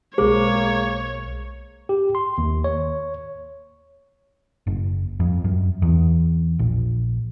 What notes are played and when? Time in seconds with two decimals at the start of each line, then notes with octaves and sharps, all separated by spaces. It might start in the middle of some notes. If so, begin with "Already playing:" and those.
0.18 B1 B2 G#3 A#3 G#4 C5 C#5
1.89 G4
2.15 C6
2.38 D#2
2.64 C#5
4.67 F#1
5.20 F2
5.44 F#2
5.82 E2
6.59 A#1